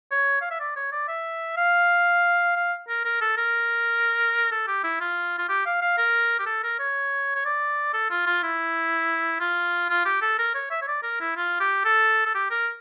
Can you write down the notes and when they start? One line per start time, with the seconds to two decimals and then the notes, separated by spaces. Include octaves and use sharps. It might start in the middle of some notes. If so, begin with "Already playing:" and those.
0.11 C#5
0.41 F5
0.51 E5
0.60 D5
0.76 C#5
0.92 D5
1.08 E5
1.57 F5
2.56 F5
2.89 A#4
3.05 A#4
3.21 A4
3.37 A#4
4.52 A4
4.67 G4
4.84 E4
5.00 F4
5.38 F4
5.49 G4
5.66 F5
5.81 F5
5.98 A#4
6.39 G4
6.46 A4
6.64 A#4
6.79 C#5
7.35 C#5
7.45 D5
7.94 A4
8.10 F4
8.26 F4
8.43 E4
9.40 F4
9.90 F4
10.05 G4
10.22 A4
10.39 A#4
10.54 C#5
10.71 E5
10.82 C#5
10.88 D5
11.03 A#4
11.20 E4
11.37 F4
11.60 G4
11.85 A4
12.26 A4
12.35 G4
12.51 A#4